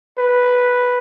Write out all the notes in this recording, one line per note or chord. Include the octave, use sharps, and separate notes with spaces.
B4